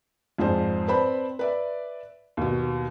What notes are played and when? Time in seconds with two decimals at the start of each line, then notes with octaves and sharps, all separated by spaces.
0.38 F2 G#2 F4 G#4 C5 D5
0.88 C4 B4 C5 D5 A5 B5
1.39 B4 D5 E5
2.37 D#2 B2